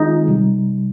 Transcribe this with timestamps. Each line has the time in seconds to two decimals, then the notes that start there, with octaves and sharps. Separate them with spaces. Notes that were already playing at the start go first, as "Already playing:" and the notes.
Already playing: D#3 G#3 C4 D#4 F4 G#4
0.28 C3 G3